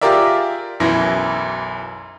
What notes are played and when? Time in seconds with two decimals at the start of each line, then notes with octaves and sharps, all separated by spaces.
0.01 F4 G4 G#4 A#4 D5 E5
0.80 B1 F#2 E3 E4 A#6